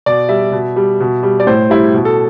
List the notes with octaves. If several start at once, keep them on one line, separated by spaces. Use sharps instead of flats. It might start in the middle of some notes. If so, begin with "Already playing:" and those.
B2 D5
G3 E5
B2
G3
B2
G3
D5
A2 C5
G3 E4
B2
A4